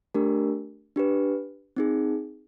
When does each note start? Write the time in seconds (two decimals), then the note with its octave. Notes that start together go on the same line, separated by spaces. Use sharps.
0.14 A3 D4 G4 A#4
0.96 D4 G4 B4
1.76 C4 D#4 G#4